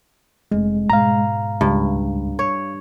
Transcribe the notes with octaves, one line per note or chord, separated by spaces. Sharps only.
F1 G#3
G#2 B2 F5 A#5
C#2 G2
C#5